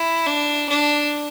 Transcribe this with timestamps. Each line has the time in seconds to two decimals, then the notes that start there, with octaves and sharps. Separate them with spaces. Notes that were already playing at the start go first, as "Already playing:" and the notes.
Already playing: E4
0.27 D4
0.69 D4